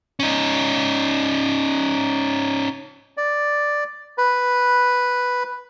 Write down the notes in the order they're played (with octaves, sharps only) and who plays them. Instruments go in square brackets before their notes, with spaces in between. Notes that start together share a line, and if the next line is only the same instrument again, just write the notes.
[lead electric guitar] C#4 D#4
[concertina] D5
B4